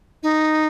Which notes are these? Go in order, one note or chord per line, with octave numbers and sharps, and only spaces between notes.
D#4